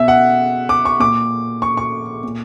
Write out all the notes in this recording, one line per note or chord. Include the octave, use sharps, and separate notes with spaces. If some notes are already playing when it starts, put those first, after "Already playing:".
Already playing: B2 E5
F#5
D6
C#6
A#2 D6
C#6
C#6
A#2